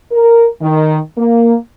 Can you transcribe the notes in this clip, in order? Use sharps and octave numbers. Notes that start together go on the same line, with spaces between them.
A#4
D#3
A#3